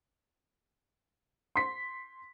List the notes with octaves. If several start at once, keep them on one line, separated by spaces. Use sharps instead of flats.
C6 B6